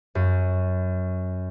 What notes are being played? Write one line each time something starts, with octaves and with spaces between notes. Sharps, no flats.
F#2